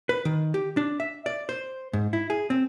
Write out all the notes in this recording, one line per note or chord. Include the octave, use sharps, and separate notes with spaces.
B4
D#3
G4
D4
E5
D5
C5
G#2
E4
G#4
C4